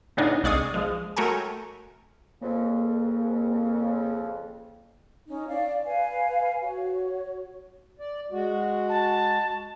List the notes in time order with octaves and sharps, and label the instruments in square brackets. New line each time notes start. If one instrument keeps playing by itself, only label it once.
[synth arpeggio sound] A2 C#3 B3 D4 D#4
C2 G#3 D5 C#6 D#6 C7
F3 G#3
A3 F#4 A#4 C#5 G5 G#5
[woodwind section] F2 C#3 [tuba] A#3
[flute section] C#4 D#4
D5 F5
B4 F5 G#5
F#4 C#5
[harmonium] D5
G#3 F#4
[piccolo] A5